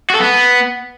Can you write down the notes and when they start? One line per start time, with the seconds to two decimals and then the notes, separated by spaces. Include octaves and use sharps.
0.10 F#4
0.15 A4
0.20 B3